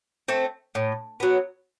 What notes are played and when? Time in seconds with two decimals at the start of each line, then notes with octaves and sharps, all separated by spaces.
0.28 A3 C4
0.75 A2
1.20 F#3 B3